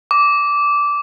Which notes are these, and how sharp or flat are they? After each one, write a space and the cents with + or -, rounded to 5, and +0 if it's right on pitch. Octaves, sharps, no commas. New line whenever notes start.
D6 -15